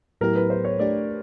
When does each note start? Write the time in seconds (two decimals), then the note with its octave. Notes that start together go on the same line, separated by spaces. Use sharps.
0.21 A2 F#3 B3 E4 G4 A#4
0.36 B4
0.50 C5
0.65 C#5
0.79 A3 D4 G4 D5